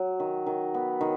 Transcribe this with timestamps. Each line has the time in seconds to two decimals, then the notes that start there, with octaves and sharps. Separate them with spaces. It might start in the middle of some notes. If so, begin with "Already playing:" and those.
Already playing: F#3
0.20 D#3
0.46 D#3
0.74 B3
1.01 D#3